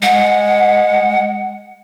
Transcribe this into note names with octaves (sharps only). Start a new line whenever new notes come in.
G#3 F#5